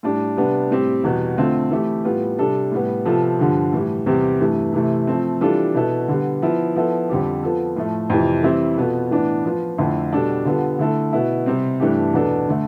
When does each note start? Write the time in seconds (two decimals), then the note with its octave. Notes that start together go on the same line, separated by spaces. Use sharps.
0.03 A2 G3 D4
0.37 C3 G3 B3 D4
0.70 A2 G3 C4 G4
1.04 E2 B2 G3
1.37 D3 A3 C4 F4
1.71 E3 A3 E4 G4
2.04 A2 G3 B3 F4
2.38 C3 G3 D4 A4
2.72 A2 G3 B3
3.05 C3 F3 B3 F4 A4
3.39 G2 D3 F3
3.73 A2 E3 G3
4.06 E2 C3 G3 C4 G4
4.40 G2 E3 A3
4.74 C3 E3 A3
5.07 F3 A3 C4
5.41 E3 G3 D4 F4 A4
5.75 B2 B3 E4 A4
6.08 D3 G3 B3
6.42 F3 B3 E4
6.76 F3 B3 E4 A4
7.09 F2 D3 G3 C4 G4
7.43 F3 B3 F4 A4
7.76 A2 F3 A3
8.10 F2 C3 E3
8.43 E3 G3 C4 E4
8.77 B2 B3 F4 A4
9.11 A2 E3 B3 D4
9.45 F3 B3 F4
9.78 F2 D3 A3 E4
10.12 B2 G3 D4 A4
10.45 D3 G3 B3 F4 A4
10.79 D3 A3 E4 A4
11.13 B2 B3 E4
11.46 C3 G3 C4
11.80 G2 E3 A3 D4 G4
12.13 E2 B2 B3 D4 A4
12.48 D3 A3